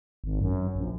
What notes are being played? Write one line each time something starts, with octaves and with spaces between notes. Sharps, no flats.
G#1
F#2
A#1